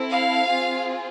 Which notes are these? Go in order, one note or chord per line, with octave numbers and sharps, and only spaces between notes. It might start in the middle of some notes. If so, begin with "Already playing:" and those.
Already playing: C4 E4 A4
F5
C4 F4 G#4